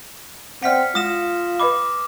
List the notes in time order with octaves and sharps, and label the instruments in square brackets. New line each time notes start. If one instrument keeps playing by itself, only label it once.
[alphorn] C4 [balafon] D5 E5 F#5 [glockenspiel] F6 B6 C#7
[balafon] G#3 [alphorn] F4 [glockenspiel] D#6 A#6 E7
[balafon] B4 D#5 B5 [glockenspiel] D6